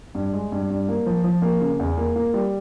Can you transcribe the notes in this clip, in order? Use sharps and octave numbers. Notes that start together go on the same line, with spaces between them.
G2
G#3
G2
G2
A#3
F3
F3
A#3
C#3
E2
A#3
A#3
G3